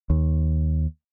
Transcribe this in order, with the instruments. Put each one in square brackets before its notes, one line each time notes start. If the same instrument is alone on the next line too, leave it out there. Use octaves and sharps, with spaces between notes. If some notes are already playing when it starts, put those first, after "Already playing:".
[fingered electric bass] D#2